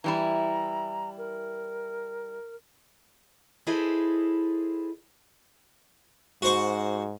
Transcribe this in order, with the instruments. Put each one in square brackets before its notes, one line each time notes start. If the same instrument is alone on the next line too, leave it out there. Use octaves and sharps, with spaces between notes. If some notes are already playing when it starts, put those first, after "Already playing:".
[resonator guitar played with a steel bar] E3 G3 E4 [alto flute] A#5
[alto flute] A#4
[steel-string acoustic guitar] E4 G#4 A4 B4 C5 D#5
[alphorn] G#2 [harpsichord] F#4 C5 C#6